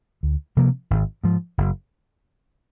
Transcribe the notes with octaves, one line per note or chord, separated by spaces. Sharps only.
D2
C3 F3 A#3
G#1
G#2 F3
F#1